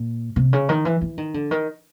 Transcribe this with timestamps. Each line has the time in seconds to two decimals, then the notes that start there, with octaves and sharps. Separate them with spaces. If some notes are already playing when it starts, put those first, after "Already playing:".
Already playing: A#2
0.36 C3
0.53 C#3
0.69 D#3
0.85 E3
1.01 E3
1.18 D#3
1.34 D3
1.51 D#3